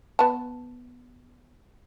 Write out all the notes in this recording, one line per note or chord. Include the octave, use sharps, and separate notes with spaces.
B3 A5